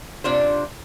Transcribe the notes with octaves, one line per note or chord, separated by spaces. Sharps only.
C3 D4 F4 C5